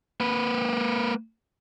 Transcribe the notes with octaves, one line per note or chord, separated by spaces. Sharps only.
A#3 B4